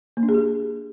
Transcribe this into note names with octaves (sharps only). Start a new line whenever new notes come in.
A#3
D4
G#4
G4